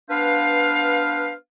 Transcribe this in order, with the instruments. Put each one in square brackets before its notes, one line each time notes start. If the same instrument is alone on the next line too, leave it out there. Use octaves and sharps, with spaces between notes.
[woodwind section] B3 D4 B4 C5 F5